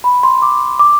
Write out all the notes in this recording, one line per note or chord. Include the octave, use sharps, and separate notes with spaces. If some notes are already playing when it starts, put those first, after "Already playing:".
B5
C6
D6
D6